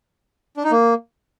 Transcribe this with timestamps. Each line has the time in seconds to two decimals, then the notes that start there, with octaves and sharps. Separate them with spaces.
0.57 D4
0.64 D#4
0.71 A#3